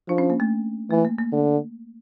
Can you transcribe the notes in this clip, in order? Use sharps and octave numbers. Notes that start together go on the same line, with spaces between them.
F3 D4
C#4
A#3
A3
E3 A3
A#3
A#3
D3